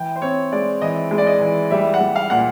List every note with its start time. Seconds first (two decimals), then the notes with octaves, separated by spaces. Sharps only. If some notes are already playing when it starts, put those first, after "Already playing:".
Already playing: E3 G5
0.16 C5
0.22 C4 C#5
0.52 G#3 D5
0.82 E3 D#5
1.11 G#3
1.18 D5
1.27 D#5
1.41 E3
1.71 G3 E5
1.94 F#5
2.00 G3
2.16 F5
2.30 A#2 F#5